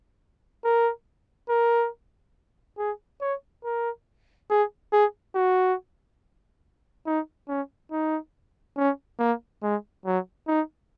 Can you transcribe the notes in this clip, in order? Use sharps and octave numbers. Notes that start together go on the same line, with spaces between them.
A#4
A#4
G#4
C#5
A#4
G#4
G#4
F#4
D#4
C#4
D#4
C#4
A#3
G#3
F#3
D#4